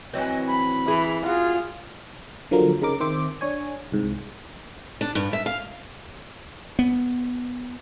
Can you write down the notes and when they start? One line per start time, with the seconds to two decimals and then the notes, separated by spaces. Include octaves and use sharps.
0.13 E3 F#3 C4 D#5
0.47 B5
0.88 E3 G#4
1.26 F4 F#4 G#4
2.51 D3 F3 F#3 A#3 A#4
2.82 C#3 D#4 A#4 D6
3.00 D#3 C4 C5 E5 D6
3.41 D4 C#5 G#5
3.92 C2 G#2
5.01 D4
5.15 G2
5.33 E5
5.46 F5
6.79 B3